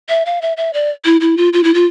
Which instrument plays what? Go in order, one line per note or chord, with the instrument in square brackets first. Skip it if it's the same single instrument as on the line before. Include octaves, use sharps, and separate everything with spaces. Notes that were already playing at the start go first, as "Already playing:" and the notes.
[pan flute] E5
F5
E5
E5
D5
E4
E4
F4
F4
E4
F4